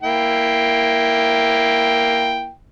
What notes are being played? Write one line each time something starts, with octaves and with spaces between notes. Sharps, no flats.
A#3 E4 G5